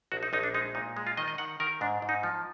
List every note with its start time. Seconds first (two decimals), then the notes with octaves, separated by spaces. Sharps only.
0.12 A#1 F#4
0.23 D#4
0.33 A#1 D#4
0.43 D4
0.54 G#3 D#4
0.75 A#2 D#4
0.97 G#3
1.07 F4
1.17 D#3 D#5
1.28 D#5
1.38 D#3 F#5
1.60 D#3 A#4
1.81 G#2 D4
2.02 G#2
2.09 D#4
2.23 F3